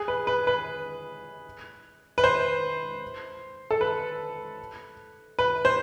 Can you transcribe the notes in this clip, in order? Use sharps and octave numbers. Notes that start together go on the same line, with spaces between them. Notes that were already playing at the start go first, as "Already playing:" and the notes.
Already playing: G#4
B4
B4
B4
B4
C5
A4
B4
B4
C5